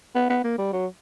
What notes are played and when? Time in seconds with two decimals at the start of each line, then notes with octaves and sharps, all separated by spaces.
0.15 B3
0.30 B3
0.44 A#3
0.58 G3
0.73 F#3